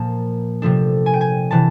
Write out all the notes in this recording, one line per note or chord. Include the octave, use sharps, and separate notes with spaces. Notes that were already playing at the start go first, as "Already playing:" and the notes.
Already playing: A#2 F3 A#3 A5
C3 F3 A3 D4
G#5
G5
G#5
C3 E3 A5